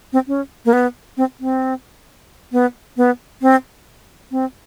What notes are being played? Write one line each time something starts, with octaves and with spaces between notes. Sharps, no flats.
C4
C#4
A#3
B3
C4
C4
B3
B3
C4
C4